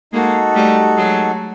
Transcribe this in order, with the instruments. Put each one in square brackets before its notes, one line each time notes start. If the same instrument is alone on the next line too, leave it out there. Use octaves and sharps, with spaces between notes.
[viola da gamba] G#3 A#3 [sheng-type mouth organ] D#4 F#4 A4
[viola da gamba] G3 A3
F#3 G#3